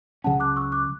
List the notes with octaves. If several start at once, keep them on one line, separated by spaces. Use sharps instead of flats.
C#2 C#3 F#3 C#4 F#5 A5
D6 F#6
C#6 E6
D6 F#6